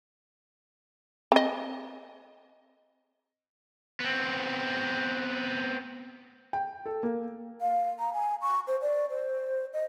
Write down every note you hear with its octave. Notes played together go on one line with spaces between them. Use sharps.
C4 D#5
B3 C4
G5
A4
A#3
F5
A#5
G#5
C#6
C5
D5
C5
D#5